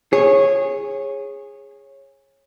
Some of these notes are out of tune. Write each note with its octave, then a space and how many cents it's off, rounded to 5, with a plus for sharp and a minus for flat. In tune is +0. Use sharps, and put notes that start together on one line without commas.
G#4 -10 C#5 -20